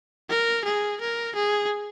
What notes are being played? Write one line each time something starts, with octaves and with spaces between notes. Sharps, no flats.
A#4
G#4
A#4
G#4